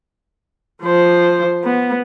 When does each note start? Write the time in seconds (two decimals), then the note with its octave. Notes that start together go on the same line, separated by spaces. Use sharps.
0.83 F3 C5
1.64 B3